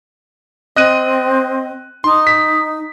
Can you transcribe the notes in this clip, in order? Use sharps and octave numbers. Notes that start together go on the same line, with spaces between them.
C4 D#5 F#6 D#7
D#4 C6
B6